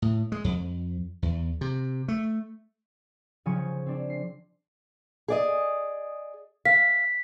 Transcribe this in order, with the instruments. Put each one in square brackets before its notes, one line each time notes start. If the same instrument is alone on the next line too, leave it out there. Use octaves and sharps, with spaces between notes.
[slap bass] A2
G#3
F2
E2
C3
A3
[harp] C#3 F3 G#5 C#6
C4 D4
C7
[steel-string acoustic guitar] G#4 D5 D#5
[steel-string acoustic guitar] F5 [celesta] B6